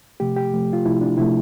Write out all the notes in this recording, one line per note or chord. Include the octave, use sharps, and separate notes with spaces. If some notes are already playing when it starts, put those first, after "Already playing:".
C3 F3 A3 G4
G4
C3 F3 A3
F4
C3 F3 A3 E4
D4
C3 F3 A3 E4